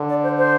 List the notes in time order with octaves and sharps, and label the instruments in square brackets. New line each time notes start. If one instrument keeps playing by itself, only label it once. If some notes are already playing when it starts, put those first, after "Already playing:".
Already playing: [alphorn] D3
[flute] D5
C5
C5